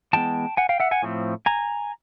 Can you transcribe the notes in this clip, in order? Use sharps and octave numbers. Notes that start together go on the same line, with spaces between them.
E3 G#3 B3 G5 A5
F#5 G#5
F5 G5
E5 F#5
F#5 G#5
A2 F3 A3 C4
G#5 A#5